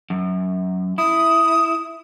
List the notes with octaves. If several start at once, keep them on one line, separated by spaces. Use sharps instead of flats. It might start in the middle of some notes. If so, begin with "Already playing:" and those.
F#2
E4 D#6